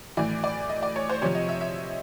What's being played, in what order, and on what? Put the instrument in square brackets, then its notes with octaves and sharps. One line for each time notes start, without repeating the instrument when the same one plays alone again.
[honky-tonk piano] A2 E3 D5
D5
D#5
D5
C#5
C5
C3 F3 C#5
D#5
E5
E5